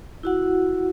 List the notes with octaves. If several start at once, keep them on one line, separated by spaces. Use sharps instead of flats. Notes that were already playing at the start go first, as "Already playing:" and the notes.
E4 F#4 F#5